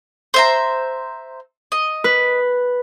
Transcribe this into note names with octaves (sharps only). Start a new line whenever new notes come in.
C5 E5 A#5
D#5
B4